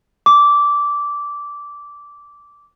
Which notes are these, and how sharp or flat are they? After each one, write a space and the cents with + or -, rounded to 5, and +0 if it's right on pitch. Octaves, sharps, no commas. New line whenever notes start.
D6 -15